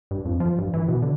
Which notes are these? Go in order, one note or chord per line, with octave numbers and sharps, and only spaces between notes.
G2
F2
F3
G2
E3
B2
D3